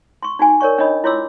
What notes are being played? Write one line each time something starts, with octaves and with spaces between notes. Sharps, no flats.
C6 C#6
D#4 F#4 G#5
A#4 C#5 D5 C#6
D4 D#4 C#5 D#5 B5 D#6
E4 F4 C#5 C6 D6 E6